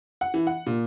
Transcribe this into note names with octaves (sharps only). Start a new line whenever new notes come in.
F#5
E3
F#5
A#2